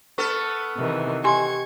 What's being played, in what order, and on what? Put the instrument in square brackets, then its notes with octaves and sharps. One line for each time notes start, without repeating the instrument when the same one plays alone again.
[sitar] B3 A4 [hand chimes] C#6 F6
[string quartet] C3 D#3 E3
[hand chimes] G4 D#5 [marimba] G#5 C6 [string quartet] C#6 G#6